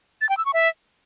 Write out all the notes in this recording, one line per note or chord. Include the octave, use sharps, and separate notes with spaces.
A6
G5
E6
C#6
E5